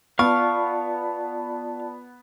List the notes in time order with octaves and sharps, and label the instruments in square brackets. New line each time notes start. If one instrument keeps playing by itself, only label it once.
[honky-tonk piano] B3 [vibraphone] F4 D5 A5 [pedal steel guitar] F5 C#6 F6